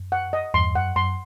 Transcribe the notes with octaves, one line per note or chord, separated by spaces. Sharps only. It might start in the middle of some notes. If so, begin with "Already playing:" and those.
Already playing: F#2
F#5
D#5
E2 G2 C6
F#2 F#5
F#2 C6